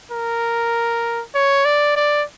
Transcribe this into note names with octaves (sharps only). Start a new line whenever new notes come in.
A#4
C#5
D5
D5